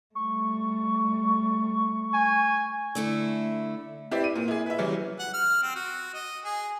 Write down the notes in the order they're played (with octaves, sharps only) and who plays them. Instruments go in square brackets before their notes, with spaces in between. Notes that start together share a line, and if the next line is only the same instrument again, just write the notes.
[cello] G3 A3 [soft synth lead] C#6
[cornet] G#5
[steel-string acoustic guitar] D3 A3 E4
[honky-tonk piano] C4 E4 G4 B4 D5
D#7
A#2
E4 G#4
B4 E5
C#3 E3 F#3 G3
[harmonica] F#5
F6
C4
F#4
D#5
G#4